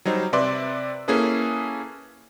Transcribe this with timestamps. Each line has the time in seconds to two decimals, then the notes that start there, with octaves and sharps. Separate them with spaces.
0.05 F#3 G3 D#4 C5
0.33 C3 B4 D5 E5 C6 D6
1.08 A#3 C#4 E4 G#4 A4 B4